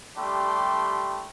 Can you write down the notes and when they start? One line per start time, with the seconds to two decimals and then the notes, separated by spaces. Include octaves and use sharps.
0.16 G3 A3 D4 G4 C6